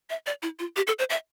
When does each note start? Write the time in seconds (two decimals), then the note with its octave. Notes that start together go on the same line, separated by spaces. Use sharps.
0.10 E5
0.26 D5
0.42 E4
0.59 F4
0.76 G4
0.87 A4
0.99 C5
1.10 E5